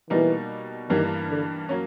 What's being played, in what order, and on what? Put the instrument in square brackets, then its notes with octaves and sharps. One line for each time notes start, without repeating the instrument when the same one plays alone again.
[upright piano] B2 G3 A#3 D#4 [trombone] E3
[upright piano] G2 E3 G3 A#3 [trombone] D#3
[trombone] D3
[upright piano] F#3 A#3 C#4